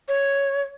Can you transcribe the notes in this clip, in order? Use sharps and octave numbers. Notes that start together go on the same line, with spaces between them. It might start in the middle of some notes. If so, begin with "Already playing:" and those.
C#5